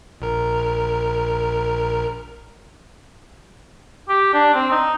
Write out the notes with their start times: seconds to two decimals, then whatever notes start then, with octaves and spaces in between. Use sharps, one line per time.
0.21 A#1 A#4
4.09 G4
4.33 D4
4.54 C4
4.71 D#4